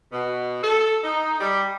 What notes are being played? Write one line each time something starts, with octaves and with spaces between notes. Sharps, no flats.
B2
A4
D#4
G3